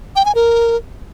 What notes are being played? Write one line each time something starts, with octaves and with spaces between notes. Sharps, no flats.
G5
G#5
A#4